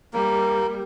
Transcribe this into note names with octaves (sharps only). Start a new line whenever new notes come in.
G3 A#3